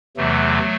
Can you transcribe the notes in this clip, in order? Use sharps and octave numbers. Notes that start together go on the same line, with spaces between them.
E2 C3 E3 F#3 A3